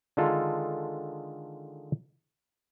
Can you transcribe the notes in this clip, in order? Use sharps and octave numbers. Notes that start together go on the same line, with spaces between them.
D3 D#3 G#3 F4 A4